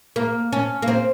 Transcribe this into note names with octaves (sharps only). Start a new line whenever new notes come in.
A#3
C#4
A#3
C4